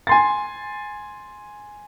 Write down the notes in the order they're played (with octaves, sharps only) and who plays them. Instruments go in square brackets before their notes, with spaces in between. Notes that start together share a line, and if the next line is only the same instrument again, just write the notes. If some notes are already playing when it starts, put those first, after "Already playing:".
[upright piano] G#5 C6 A6